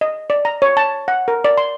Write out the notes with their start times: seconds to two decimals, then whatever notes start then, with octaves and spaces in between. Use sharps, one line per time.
0.01 D#5
0.30 D5
0.45 A#5
0.62 C#5
0.77 A5
1.08 F#5
1.28 A#4
1.45 D5
1.58 C6